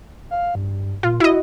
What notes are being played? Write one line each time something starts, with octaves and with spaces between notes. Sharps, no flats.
F5
G2
A#2 F4
E4 F#4 D#5